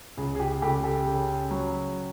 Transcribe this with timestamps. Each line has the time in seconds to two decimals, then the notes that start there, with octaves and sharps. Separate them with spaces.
0.17 C#2 G#4
0.35 G#4
0.40 G4
0.62 C#2 G4 A4
0.84 G4 A4
1.06 C#3
1.51 F#3